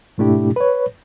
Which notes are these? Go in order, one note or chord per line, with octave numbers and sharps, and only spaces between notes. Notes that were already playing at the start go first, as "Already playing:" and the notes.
G#2 B2 A3 D4 E4 G4
B4 C#5